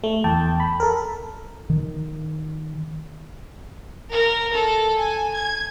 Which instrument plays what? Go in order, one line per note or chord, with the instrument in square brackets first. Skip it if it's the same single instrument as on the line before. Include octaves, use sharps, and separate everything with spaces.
[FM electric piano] A3
E2 G5 A5
B5
A4 A#4
[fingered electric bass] D#3
[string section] A#4
A4
G#5
G#6